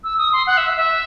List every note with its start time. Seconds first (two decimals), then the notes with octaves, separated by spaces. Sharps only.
0.04 E6
0.18 D#6
0.33 C6
0.47 F#5
0.57 E5
0.76 E5